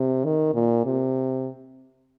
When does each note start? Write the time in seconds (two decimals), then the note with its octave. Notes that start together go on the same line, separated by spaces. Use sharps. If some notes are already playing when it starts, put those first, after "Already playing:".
Already playing: C3
0.24 D#3
0.54 A#2
0.85 C3